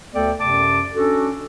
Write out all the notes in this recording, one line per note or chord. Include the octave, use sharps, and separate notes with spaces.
D2 A3 B3 A4 D5 G5
F#2 C3 D5 A5 D6
C#4 D4 F#4 A4